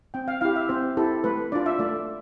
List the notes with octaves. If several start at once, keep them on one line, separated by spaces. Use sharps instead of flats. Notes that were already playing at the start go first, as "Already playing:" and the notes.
C4 G5
F5
E4 G4 F5
E5
C4 C5
E4 G4 A4
A3 B4
D4 F4 D5
E5
A3 D5